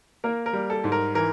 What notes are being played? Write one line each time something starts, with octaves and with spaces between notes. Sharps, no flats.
A#3 A#4
A#4
G3
A4
G#2
A#4
E3 A#4